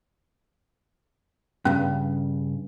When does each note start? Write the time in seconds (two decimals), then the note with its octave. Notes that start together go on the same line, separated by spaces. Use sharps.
1.65 G2 C#3 C#4